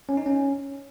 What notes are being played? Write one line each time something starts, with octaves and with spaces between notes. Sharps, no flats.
C#4
D#4
C#4